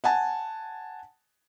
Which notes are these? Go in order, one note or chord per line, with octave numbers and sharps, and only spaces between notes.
F#5 G#5 A5